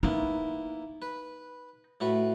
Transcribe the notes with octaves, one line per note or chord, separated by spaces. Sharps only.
A#3 B3 D#4 E4
B4
A2 F#4 B4